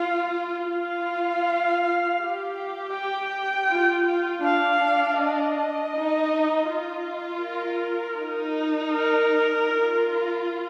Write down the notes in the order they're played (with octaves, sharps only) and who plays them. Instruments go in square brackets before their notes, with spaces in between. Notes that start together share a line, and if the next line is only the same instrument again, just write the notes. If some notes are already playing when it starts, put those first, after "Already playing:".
Already playing: [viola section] F4 [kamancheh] F5
[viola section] F4 [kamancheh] F5
[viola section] G4
[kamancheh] G5
[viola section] F4
F4
[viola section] D4 [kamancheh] F5
[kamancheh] D#5
[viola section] D#4
F4
[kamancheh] A#4
[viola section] D#4
[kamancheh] A#4
[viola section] F4